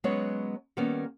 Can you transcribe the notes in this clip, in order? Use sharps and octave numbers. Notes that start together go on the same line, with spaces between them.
F#3 G#3 B3 C#4 B4 C#5
D#3 G3 A#3 B3 C#4